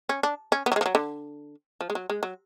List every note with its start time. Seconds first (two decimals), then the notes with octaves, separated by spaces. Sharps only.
0.09 C#4
0.23 D4
0.52 C#4
0.66 B3
0.72 F#3
0.76 G#3
0.81 F3
0.86 F#3
0.95 D3
1.81 F3
1.90 G#3
1.95 F#3
2.10 G#3
2.23 F#3